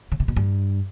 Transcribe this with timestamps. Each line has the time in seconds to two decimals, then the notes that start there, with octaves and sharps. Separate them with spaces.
0.12 C#3
0.20 C3
0.28 B2
0.36 G2